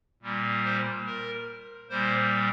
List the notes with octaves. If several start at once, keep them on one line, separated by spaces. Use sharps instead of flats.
A#2 G3 A#3
C5
A#4
A#2 G3 A#3 C5